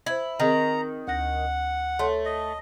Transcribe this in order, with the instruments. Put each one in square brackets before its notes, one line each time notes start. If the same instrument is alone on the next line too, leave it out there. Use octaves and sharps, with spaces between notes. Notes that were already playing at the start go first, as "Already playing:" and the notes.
[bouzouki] E4 [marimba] C5 G#6
[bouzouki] D#3 [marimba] C4 G#4 A#4 [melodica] A#5
[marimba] D2 A#6 [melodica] F#5
[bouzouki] A3 [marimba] A4 C#5 C6
[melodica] D#5